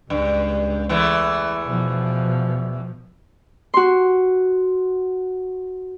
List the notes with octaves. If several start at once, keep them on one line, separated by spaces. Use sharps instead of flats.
C#2 G2
E2 E3 A3
B2 F3
F#4 C6